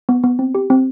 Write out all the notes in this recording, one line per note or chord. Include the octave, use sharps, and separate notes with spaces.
B3
B3
C4
G4
C4